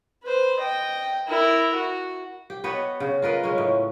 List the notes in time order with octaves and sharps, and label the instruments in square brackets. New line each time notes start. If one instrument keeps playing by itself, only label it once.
[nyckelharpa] B4 C5
D#5 G5
E4 A#4
F#4
[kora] G4
B3 B4 C#5 D#5
C#3
F4 A#4 B4 D#5
G#3 C#4
A2